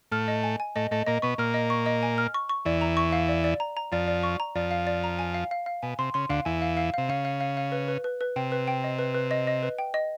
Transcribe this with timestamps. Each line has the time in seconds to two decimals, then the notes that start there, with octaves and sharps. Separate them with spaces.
0.12 A2 A3 F6
0.28 D#5
0.44 G#5
0.60 G#5
0.75 A2 A3 D#5
0.91 A2 A3 D#5
1.07 A#2 A#3 D#5
1.22 B2 B3 C#6
1.38 A#2 A#3 F6
1.54 D#5
1.70 C#6
1.86 D#5
2.03 G#5
2.18 F6
2.34 C#6
2.49 C#6
2.65 E2 E3 D5
2.81 A#5
2.97 C#6
3.12 F5
3.29 D5
3.44 D5
3.60 A#5
3.77 A#5
3.92 F2 F3 D5
4.08 D5
4.23 C#6
4.40 A#5
4.55 F2 F3 D5
4.71 F5
4.87 D5
5.04 A#5
5.19 G#5
5.34 F5
5.51 F5
5.66 F5
5.83 B2 G#5
5.99 C3 C6
6.14 C#3 C6
6.29 D2 D3 F5
6.45 E2 E3 G#5
6.62 F5
6.77 F5
6.94 C3 F5
7.09 C#3 F5
7.25 F5
7.40 F5
7.57 F5
7.72 B4
7.88 B4
8.04 B4
8.21 B4
8.36 C3 G5
8.52 B4
8.68 G5
8.84 D#5
8.99 B4
9.14 B4
9.31 D#5
9.47 D#5
9.63 B4
9.78 G5
9.94 D#5